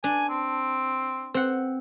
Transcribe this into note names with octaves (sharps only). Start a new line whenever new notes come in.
D4 G#5
C4
C4 F#5